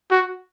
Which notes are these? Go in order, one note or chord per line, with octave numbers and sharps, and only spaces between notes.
F#4